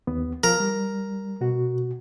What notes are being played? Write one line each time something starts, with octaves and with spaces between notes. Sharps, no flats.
D#2 B3
F3 A#4
G3
B2 F#4